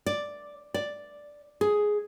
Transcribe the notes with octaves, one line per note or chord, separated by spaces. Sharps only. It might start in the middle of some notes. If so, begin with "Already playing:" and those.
D5
D5
G#4